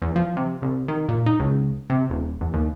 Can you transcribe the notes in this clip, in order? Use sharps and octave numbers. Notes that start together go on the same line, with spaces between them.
E2
F3
C3
C2
D#3
A#2
D#4
C#2
C3
D#1
E2
D#2